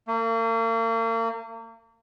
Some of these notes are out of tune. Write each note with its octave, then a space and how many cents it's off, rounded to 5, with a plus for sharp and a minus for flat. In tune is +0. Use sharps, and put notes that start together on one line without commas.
A#3 -40